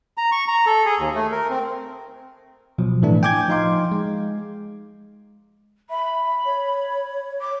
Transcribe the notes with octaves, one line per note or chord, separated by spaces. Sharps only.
A#5
C#6
A#5
A4
G#4
D#2
A3
A#4
C4
B2 F3 F#3
A2 E3 A3 D4
G5 G#5 D6 G6 G#6
F3 D#4 F5 C6 D6
G#3
E5 B5
C#5
D6